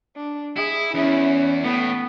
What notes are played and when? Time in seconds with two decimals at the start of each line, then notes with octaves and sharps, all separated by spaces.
0.16 D4
0.56 E4 G#4
0.94 E2 C#4 E4
1.64 A2 B3